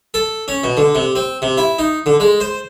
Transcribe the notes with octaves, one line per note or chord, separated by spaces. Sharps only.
A4
C#4
B2
D3
C3
C4
C3
E4
D#4
D3
G#3
C5